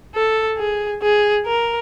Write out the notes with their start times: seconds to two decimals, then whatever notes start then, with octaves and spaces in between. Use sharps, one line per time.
0.15 A4
0.58 G#4
1.02 G#4
1.46 A#4